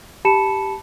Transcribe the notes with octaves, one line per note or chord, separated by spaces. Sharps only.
G4 A5 B5 C#7 E7